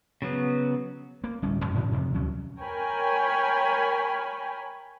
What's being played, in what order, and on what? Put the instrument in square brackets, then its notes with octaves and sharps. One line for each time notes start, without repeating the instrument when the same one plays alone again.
[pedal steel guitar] C#3 F#3 B3
[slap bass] A#3
D1 G3 C#4
F2 G#2 D#3 F3
G#2 C#3 E3
F2 C3
D2 F#3 C#4
[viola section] A#4 C#5 G5 G#5 B5